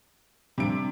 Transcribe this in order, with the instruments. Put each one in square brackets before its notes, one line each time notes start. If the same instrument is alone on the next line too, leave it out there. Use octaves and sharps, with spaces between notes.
[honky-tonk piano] C3 D7 [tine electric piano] F3 G3 D4